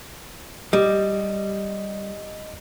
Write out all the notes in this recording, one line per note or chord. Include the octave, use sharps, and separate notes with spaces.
G3 D#5